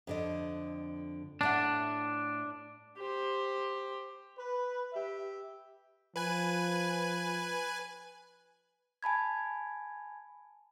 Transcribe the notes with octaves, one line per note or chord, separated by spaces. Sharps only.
F2 D3 D#5
A2 A3 D4 F#5
G4 C5
B4
G4 E5
F3 B4 G#5
G#5 A5 B5 G#6